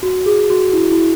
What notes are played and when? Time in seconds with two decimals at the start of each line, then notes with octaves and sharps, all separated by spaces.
0.03 F#4
0.26 G#4
0.50 F#4
0.73 E4
0.91 E4